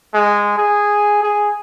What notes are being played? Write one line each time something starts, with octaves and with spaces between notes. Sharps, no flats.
G#3
G#4
G#4